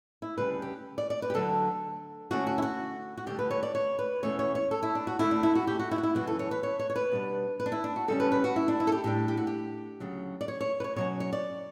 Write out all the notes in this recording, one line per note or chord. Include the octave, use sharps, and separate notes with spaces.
E4
D2 C#3 G3 B4
G4
D5
D5
B4
G4
D2 D3 F#3 A4
D2 D3 A3 C#4 F#4
F#4
E4
F#4
F#4
D2 D3 G3 G4
B4
C#5
D5
C#5
B4
E2 B2 A3 C#4 C#5
C#5
C#5
A4
E4
D4
F#4
D2 D3 A3 E4
D4
E4
F#4
G4
F#4
E4
F#4
E4
F#2 C#3 E3 F#4
A4
C#5
B4
C#5
C#5
C#5
B4
B2 G3 D4
B4
D4
E4
D4
F#4
C#3 G3 C#4 A4
B4
B4
F#4
E4
D4
E4
A4
G4
A2 G3 D4 G4
G4
F#4
G4
D2 C#3 F#3
D5
C#5
C#5
B4
C#5
B2 F#3 C#4 C#5
C#5
D5